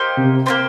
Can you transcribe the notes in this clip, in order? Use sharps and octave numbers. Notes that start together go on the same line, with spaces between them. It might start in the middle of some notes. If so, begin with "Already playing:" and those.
Already playing: A#3 D#4 G4 C5
C3
A#3 D#4 G4 C5